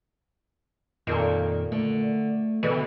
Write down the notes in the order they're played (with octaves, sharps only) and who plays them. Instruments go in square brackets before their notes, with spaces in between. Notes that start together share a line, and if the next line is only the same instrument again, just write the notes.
[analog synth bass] F2 [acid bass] A#2 [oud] D#3 A#3 A4
[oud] D3 [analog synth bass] A3
[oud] B2 D3 [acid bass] E3